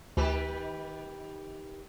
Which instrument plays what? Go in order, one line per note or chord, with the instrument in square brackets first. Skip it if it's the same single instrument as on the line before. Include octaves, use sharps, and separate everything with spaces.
[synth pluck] D2 [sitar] D#3 G4 B4